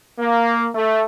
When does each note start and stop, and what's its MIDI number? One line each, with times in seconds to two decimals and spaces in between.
0.19 0.69 58
0.75 1.03 57